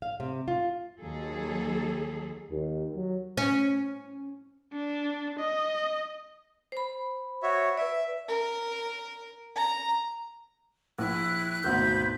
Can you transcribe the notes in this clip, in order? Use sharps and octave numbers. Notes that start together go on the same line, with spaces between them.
F5
C3
F4
D#2 F#3 G#4 A4
D#2
F#3
C#4
D4
D#5
C5 B5
F#4 C#5 E5
B4 D5 E5
A#4
A#5
A#1 E4 F#6
G#1 D2 B2 B4 G6